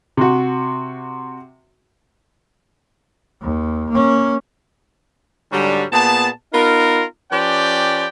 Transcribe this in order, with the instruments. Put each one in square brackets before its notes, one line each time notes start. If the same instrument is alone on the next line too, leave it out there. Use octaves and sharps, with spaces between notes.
[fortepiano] C3 F#4
[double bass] D#2
A#3 C#4
[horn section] G#2 D3 F#3 G3
A#2 B3 G#4 A5
B3 D#4 F4 A#4
F3 C#4 G4 B4 D5 G5